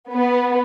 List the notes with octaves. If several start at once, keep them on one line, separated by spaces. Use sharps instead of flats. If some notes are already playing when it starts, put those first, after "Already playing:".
B3